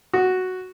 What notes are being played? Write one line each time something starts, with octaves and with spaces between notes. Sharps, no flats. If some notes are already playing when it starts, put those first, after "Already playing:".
F#4